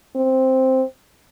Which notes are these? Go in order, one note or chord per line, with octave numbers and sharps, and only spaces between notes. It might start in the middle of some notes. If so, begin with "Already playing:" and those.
C4